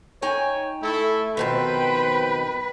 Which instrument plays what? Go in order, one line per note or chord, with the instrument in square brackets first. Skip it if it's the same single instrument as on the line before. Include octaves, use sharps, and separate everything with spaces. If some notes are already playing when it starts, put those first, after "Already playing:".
[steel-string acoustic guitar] D#4 G5 G#5 [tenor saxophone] C#5
[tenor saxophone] A3 [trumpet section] E4 A4
[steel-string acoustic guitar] F2 B2 D#3 [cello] B4 [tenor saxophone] C5 [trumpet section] G5